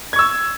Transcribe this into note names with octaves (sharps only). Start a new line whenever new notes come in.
C#6 E6 G#6